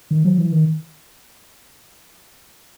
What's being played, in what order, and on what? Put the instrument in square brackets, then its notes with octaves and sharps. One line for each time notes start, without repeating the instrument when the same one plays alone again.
[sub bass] D#3
F#3
E3
D#3